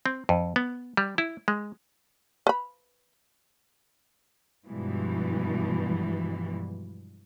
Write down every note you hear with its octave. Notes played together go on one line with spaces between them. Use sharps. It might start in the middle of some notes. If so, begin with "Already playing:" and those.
C4
F2
B3
G3
E4
G#3
B4 B5
G2 B2 E3 F3 G3 G#3